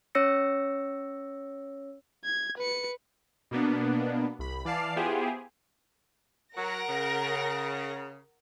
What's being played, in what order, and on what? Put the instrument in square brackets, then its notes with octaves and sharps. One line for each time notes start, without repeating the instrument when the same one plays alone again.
[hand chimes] C#4 C#5 E6 A#6 C#7
[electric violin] G#6
B4 C#7
[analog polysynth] B2 A#3 B3 D4
C2 B5
E3 D5 F5 A5 C7
B3 E4 F4 G4 G#4 C5
[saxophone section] F#3 [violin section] A#4 F#5 A#6
[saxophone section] C#3